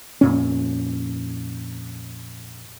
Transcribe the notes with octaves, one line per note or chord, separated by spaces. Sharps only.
F2 A#2 C#4